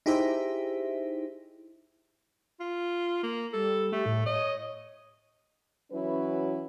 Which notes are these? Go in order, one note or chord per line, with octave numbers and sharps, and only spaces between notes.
D#4 E4 G4 G#4 C5 E5
F4
A#3
G3 A4
A3 G4
A2
C#5 D#5
E3 F#3 C#4 E4 F#4 B4